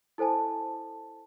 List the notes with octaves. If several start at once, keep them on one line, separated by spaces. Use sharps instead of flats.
E4 A4 C5 G#5 A5